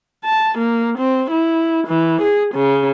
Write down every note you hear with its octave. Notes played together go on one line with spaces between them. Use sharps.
A5
A#3
C4
E4
E3
G#4
C#3